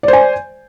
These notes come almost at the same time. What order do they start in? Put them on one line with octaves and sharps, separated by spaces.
D5 C5 G#5